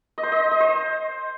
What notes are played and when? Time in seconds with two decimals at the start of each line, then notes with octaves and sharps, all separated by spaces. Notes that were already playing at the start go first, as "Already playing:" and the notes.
0.18 D#5
0.23 C5
0.32 D#5
0.51 D#5
0.60 C5